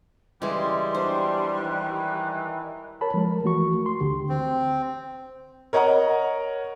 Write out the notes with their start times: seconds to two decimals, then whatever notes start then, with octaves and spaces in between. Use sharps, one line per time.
0.42 F#2 C#3 E3 G3 G#3 C6
0.95 E2 F#3 D4 C5
1.56 D#3 E3 F#6
3.01 A#4 C#5 A5 B5
3.14 F3 G#3 A#4
3.44 E3 A3 F#4 C#6
3.86 C6
4.01 D2 D3 G4
4.29 C4
5.73 A#4 C#5 D#5 F#5 A#5